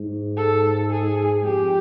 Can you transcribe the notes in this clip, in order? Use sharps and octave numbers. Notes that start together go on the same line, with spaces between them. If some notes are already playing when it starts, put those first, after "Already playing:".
Already playing: G#2
A4
G#4
F2 G4